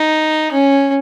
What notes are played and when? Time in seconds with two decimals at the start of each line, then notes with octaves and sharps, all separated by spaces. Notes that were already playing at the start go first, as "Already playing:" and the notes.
Already playing: D#4
0.52 C#4